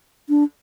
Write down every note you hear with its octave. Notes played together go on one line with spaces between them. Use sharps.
D4